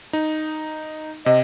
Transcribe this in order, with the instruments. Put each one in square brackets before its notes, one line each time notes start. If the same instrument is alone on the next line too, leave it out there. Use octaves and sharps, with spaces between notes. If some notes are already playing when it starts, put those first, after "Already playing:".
[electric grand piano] D#4
[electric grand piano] C3 [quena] D#5